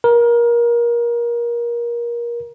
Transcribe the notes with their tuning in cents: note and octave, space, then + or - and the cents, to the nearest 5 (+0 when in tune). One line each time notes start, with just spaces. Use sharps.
A#4 +25